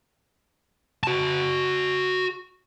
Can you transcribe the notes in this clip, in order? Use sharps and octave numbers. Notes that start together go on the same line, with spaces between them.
F#4 A5